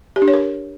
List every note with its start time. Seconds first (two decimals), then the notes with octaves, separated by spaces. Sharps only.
0.16 G4
0.22 D4
0.28 C#5
0.33 A#4